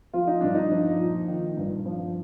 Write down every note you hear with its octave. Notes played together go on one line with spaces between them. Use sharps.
F3 F4
D#4
G2 D4
D#4
F3
A#2
D#3
G2
F3